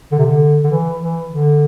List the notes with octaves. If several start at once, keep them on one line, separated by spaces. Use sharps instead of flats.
D3
C3
D3
D3
E3
E3
D3